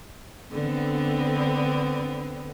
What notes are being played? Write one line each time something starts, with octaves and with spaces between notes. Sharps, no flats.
D3 B3 C4